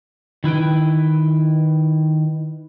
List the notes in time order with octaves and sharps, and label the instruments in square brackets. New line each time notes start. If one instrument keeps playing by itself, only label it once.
[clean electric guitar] D#3 E4 B4 G5